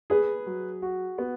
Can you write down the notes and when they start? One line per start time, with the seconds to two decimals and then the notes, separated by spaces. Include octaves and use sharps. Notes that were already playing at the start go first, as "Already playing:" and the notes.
0.10 G#4 B4
0.46 F#3
0.82 F#4
1.18 B3